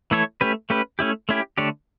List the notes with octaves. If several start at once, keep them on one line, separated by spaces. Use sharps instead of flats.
E3 A3 E4 A4 C#5
A3 C#4 G4 B4
A3 C#4 G4 B4
A3 C#4 E4 G4
A3 C#4 E4 G4
D3 A3 D4 G4 C#5